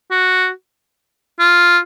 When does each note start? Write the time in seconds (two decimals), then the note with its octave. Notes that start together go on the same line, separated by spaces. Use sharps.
0.11 F#4
1.39 F4